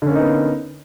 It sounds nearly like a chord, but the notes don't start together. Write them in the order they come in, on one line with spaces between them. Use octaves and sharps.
D3 C#4 A#3 D#4 B3